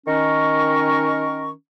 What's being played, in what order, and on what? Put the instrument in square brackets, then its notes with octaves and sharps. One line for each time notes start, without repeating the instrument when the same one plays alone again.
[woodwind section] D#3 C#4 A#4 C#6